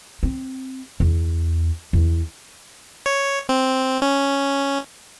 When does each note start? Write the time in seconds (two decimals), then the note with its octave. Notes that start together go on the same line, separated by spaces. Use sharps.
0.23 C4
1.00 E2
1.93 E2
3.06 C#5
3.49 C4
4.02 C#4